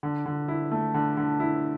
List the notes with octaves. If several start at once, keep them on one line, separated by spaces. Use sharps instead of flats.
D3
D3
E4
A3
D3
D3
E4